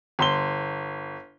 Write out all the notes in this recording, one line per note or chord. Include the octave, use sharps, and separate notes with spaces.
G1 C6 G7